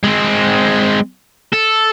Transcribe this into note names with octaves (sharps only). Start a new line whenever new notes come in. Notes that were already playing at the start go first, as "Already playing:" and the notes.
G#3 C4
A4